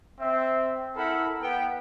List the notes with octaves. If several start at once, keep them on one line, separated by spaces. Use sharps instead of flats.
C4 E5
E4 A4 A#4 F#5 B5
B3 G5